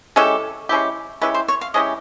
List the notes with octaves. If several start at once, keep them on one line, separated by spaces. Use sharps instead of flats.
G#3 C#4 E4 G4 A4
G#3 C#4 E4 G4
G#3 C#4 E4 G4 B4
C5
C#5
F5
G#3 C#4 E4 G4 D#5